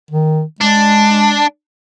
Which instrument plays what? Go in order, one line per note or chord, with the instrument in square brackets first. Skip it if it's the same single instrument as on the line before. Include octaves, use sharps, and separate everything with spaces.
[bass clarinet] D#3
[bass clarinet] G#3 [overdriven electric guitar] D4